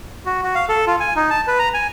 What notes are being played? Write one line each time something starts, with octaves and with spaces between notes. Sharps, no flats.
F#4
F#4
F5
A4
F4
G#5
D#4
A5
B4
A#5
G#5